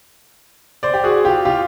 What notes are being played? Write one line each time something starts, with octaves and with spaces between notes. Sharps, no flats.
C5 D5
G4
F#4 G#4
F4 G4
F4 G4